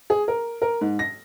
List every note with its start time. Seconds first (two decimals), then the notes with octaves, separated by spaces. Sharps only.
0.10 G#4
0.28 A#4
0.62 A#4
0.81 G#2
0.99 A#6